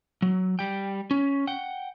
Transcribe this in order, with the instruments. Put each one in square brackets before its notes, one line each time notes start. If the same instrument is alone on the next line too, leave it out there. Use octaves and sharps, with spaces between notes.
[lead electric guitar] F#3
G3 G5
C#4
F#5 G5